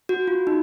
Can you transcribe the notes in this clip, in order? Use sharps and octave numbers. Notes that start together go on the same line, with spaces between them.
F#4
F4
D#4